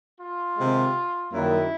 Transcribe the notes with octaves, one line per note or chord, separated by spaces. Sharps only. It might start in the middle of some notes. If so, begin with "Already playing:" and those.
F4
C3 D#3 G#3
F#2 D#3 G3 A#3 E4